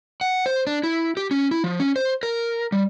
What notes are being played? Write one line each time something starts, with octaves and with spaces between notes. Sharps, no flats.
F#5
C5
D4
E4
G4
C#4
E4
F3
C#4
C5
A#4
G3